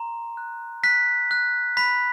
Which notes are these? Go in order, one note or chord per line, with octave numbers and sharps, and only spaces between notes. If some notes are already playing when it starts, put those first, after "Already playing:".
Already playing: A#5 C6
F#6
F#6 B6
F#6
B5 B6